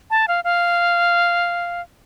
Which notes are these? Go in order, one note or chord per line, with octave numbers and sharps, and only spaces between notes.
A5
F5
F5